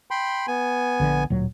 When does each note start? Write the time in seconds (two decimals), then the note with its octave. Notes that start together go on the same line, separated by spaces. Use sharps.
0.11 G5 B5 C6
0.48 B3 G#5
1.00 A#1 D3
1.30 D1 A#2 F#3